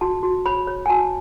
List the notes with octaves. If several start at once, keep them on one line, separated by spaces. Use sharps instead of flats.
F#4 A5
F#4
C#5 B5
C#5
G#5
F#4 A5